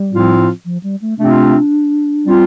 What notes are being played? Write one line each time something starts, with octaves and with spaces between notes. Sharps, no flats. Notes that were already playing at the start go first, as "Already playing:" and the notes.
Already playing: G3
A2 F3 C4 F4
F3
G3
A3
C3 A3 C4 D4 F4
G3 C4 F4